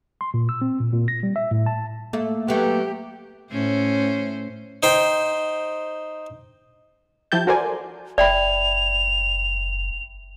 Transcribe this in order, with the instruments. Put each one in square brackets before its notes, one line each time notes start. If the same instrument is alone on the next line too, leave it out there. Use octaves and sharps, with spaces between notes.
[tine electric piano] C6
A#2
E6
C4
A#2
A#2
A#6
G3
E5
A2
A5
[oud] A3 [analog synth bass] A#3
[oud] F#3 A3 B3 [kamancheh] G4
[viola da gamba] A2 C#4 C5
[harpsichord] D#4 C5 G5
[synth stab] F3 E4 G4 A5 G6
F#4 A4 A#4 C5 D5 G#5
[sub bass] F#1 [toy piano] D5 [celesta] E5 G5 B5 [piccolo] F7